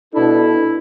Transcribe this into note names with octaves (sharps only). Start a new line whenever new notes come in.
B2 D4 E4 A4